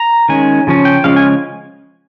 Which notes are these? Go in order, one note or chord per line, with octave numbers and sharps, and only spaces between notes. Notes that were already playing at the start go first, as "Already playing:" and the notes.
Already playing: A#5
D#3 G#3 C#4 G#5
C#3 F3 C#4
G5
C#3 F3 G#3 C#4 F5
G#5